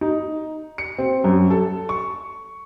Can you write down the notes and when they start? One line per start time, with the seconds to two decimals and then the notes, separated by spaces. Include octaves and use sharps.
0.01 D#4
0.78 C#7
0.98 C4
1.24 F#2
1.50 A4
1.89 C#6